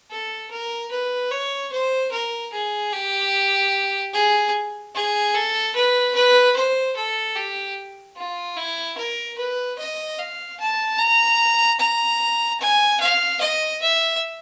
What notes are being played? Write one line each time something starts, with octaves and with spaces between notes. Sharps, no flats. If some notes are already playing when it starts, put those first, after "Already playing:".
A4
A#4
B4
C#5
C5
A#4
G#4
G4
G#4
G#4
A4
B4
B4
C5
A4
G4
F4
E4
A#4
B4
D#5
F5
A5
A#5
A#5
G#5
F5
D#5
E5